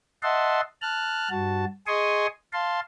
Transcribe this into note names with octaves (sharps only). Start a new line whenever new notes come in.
D#5 E5 F#5 A5 C6
A5 F6 F#6
G2 F#4 A5
G#4 D#5 G#5 C6 C#6 D#6
F5 A5 C6